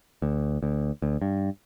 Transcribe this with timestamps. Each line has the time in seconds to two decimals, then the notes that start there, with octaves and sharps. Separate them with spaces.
0.22 D2
0.62 D2
1.02 D2
1.21 G2